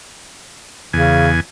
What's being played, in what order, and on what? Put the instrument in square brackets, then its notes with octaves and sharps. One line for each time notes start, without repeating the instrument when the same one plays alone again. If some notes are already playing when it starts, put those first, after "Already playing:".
[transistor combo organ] E2 G#5 [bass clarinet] C#3